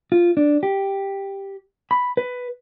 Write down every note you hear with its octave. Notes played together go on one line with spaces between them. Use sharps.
F4
D4
G4
B5
B4